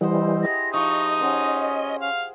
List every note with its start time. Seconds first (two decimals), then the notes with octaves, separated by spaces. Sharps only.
0.01 E3 G3 C5 D#5 F#5
0.43 E4 G4 G#4 A#6
0.74 F3 D#4 D#5 C#6
1.20 C#4 G#4 C5 F#5
2.02 F5